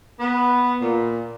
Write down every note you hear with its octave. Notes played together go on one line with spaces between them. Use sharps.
B3
A#2